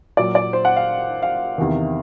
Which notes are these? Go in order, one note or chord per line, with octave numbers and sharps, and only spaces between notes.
A#2 F#3 D5
D5
C5
F#5
F5
F5
E2 C3 D#3